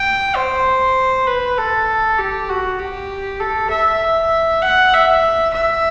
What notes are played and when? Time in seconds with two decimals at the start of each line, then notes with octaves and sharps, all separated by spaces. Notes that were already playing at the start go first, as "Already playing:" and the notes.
Already playing: G5
0.35 C5
1.27 B4
1.58 A4
2.18 G4
2.49 F#4
2.79 G4
3.40 A4
3.70 E5
4.62 F#5
4.93 E5
5.54 E5